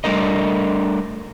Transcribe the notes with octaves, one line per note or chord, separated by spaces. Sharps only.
G3 A3 D4 A#4 D#5